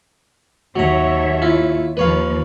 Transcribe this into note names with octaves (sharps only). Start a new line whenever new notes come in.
D#2 F#3 C#5 E5 A#5
E4 F4
D#2 F3 B4 C#5 F5